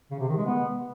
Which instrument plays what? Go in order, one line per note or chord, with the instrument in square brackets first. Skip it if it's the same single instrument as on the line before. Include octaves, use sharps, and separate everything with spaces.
[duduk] C#3
C3
D#3
G#3
B3